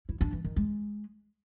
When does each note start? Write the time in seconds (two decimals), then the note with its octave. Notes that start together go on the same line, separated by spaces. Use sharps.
0.09 E4
0.21 D4
0.33 E3
0.44 D#3
0.56 G#3